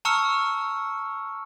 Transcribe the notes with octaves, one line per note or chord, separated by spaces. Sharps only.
A5 A#5 C#6 E6 F6 C#7